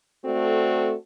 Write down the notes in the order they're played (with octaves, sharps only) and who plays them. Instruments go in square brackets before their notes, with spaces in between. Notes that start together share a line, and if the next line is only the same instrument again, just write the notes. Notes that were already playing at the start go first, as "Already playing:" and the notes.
[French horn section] A3 C4 F#4 A4 D5